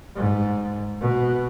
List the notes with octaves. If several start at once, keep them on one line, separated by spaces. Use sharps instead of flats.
G#2
B2